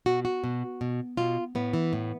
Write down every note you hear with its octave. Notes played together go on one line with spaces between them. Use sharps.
B2 F#4
F#4
B2
B2
B2 F4
A2 B3
E3
A2